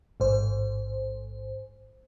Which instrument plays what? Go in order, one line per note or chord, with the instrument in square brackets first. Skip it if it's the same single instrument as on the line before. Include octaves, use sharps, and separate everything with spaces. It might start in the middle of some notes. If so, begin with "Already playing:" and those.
[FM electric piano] A1 G#2 C5